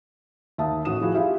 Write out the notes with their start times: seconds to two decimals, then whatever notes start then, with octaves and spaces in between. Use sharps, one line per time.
0.58 D#2 E5 A5 D#6
0.85 A1 F#4 C#5 D#6 E7
1.01 F3 E4 F#4 G#4
1.14 E4 F4 G4 G#4 E5 F5